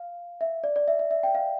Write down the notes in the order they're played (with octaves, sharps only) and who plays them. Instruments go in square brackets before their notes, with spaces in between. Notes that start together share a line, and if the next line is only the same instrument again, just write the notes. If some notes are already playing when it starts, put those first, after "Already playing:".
Already playing: [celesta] F5
E5
D5
D5
E5
E5
E5
G5
F5